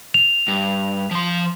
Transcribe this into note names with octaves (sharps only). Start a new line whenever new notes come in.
F7
G2
F3 C6